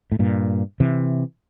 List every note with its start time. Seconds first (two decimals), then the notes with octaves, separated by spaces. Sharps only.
0.12 A2
0.19 G2 A#2
0.80 C3 E3